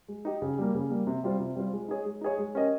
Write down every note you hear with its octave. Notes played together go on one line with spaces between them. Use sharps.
G#3
D#4 G4
C#3
G3 A#3
C#3
G3 A#3
C3
G3 C4 F4 C5
C3
G3 C4 F4 C5
G#3
D#4 G#4 C#5
G#3
D#4 G#4 C#5
G#3
C#4 G4 A#4 D#5